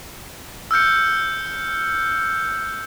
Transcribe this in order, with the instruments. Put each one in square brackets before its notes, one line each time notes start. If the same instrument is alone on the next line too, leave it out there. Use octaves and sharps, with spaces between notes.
[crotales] E6 F6 G6 C#7